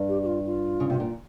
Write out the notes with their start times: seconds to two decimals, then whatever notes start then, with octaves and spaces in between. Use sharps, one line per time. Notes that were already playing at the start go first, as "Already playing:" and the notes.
Already playing: G2
0.09 G4
0.22 G4
0.26 F4
0.46 F4
0.80 C#3
0.90 C3
1.00 A#2